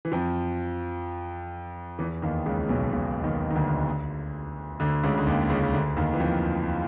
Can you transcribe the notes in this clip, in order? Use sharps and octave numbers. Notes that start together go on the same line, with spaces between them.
E3
F2 F3
E2 E3
D#2 D#3
C#2 C#3
B1 B2
B1 B2
D#2 D#3
D#3
D2 D3
D2 D3
C#2 C#3
D3
D#2 D#3
C#2 C#3
D2 D3
D#2 D#3
E3
F2 F3